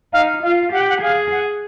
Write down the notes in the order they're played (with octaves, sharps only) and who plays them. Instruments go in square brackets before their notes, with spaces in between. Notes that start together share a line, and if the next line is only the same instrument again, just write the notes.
[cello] D#4 [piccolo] F5
[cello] F4 [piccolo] F5
[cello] G4 [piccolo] F#5
[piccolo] G5
F#5
[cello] G#4 [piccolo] F5
[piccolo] F#5